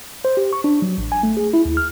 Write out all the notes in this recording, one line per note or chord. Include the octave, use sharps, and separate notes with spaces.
C5
G4
C#6
D4
F#3
A1
G#5
A3
G#4
E4
D#2
F6